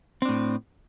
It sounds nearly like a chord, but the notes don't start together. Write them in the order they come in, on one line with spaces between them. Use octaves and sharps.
C4 D4 A2